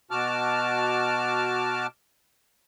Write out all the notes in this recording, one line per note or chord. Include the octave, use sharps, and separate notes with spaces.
B2 F#4 A5 D6 F6